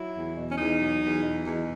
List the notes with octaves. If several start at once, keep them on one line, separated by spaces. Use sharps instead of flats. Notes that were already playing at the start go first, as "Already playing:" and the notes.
Already playing: F#3 E4
E2
B2
C#4
E2 D#4
F#3
E2
B2
E2